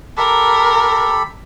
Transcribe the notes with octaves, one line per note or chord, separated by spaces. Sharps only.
G4 A4 A#4 B5